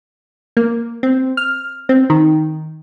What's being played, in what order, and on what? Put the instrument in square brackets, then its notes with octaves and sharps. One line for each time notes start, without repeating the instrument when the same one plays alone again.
[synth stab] A#3
C4
F6
C4
D#3